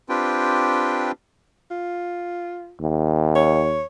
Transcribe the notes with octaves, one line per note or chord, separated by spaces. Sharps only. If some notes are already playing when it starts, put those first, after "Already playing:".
C4 D4 F4 G4 B4 G5
F4
D#2
C#5